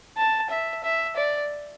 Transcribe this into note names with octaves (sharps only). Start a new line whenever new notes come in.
A5
E5
E5
D5